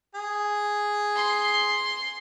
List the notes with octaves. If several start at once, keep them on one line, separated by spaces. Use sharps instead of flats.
G#4
C6